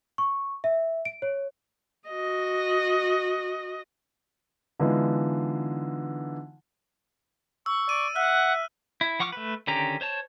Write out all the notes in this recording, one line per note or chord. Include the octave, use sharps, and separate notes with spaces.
C#6
E5
D7
C#5
F#4 D#5
D3 E3 G#3 B3 D#4 F4
C#6 E6
D5 D#7
E5 F#5 F6 F#6
E4
F3 F#5 C#6 D6 F6
A3 B4
D3 D#3 C#4 G4 A#5
C5 C#5 A5